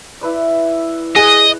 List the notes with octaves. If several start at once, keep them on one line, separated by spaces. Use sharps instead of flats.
E4 B4 D5
G#4 D#5 F#5